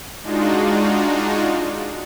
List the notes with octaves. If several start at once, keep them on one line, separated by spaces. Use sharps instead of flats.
G#3 D4 D#4 F4 F#4